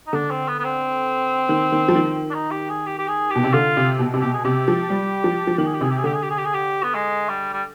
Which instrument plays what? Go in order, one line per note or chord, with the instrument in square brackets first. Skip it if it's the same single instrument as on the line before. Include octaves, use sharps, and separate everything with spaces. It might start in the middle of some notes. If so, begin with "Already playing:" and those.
[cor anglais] D#4
[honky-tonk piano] D3 [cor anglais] D4
[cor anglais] C4
B3
B3
C4
[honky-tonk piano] D#3
D#3
F3
D#3
[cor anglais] D4
D#4
G4
G#4
G4
G4
G#4
G4
[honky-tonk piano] B2
C3
[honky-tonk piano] D3 [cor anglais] F4
[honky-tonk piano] C3
B2
C3
[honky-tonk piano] B2 [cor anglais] G4
[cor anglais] G#4
[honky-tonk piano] C3 [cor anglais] G4
[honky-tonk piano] F3
G3
F3
F3
[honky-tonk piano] D#3 [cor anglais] G4
[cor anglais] G#4
G4
[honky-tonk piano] C3 [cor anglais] G#4
[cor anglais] G4
G#4
[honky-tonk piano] D3 [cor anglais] G4
[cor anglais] G#4
G4
G#4
G4
G#4
G4
B3
G#3
G3
G3